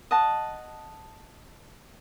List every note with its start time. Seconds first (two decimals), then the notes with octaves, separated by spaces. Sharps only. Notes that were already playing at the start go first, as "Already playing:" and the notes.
0.11 D#5 F#5 A5